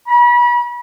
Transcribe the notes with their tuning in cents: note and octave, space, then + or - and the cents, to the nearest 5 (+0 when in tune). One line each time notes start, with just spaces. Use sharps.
B5 -35